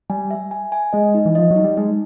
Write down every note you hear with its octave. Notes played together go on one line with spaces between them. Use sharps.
G3 G#5
E5
G#5
G#5
G#3 D#5
D#4
E3
F3 D#5
F#3
D#4
G3
G#3 D#4